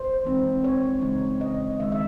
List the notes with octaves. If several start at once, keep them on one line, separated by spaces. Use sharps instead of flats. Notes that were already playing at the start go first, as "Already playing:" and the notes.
Already playing: C5
E3 G#3 C4 D#4
C#5
C#3 G#3 D#4
D#5
D#3 G#3 D#4 E5
E5